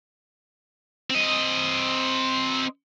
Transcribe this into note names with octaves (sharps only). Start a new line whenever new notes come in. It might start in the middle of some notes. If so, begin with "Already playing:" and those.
C4 D#5